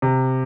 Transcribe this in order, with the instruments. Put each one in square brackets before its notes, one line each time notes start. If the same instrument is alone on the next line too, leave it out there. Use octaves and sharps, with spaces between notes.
[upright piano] C3